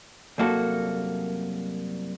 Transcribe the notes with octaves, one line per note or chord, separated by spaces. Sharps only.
C2 F#2 A#3 F#4 A4